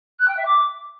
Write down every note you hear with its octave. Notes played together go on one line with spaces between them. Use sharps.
F#6
G5
E5
D6